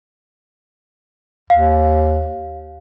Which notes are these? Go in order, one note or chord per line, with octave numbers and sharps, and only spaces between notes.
D#2 F5